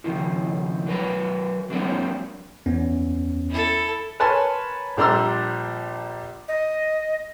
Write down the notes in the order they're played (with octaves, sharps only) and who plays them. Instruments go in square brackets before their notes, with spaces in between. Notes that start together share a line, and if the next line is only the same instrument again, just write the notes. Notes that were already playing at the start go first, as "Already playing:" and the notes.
[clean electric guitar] C#2 D#3 F3
F#3 A#4 B4
F#3 G#3 A#3 C4 D4
[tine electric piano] E2 B3 C#4
[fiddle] E4 A4
[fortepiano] A#4 B4 C#5 G#5 A5 C6
A#1 G3 D4 A#5 C6 E6
[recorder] D#5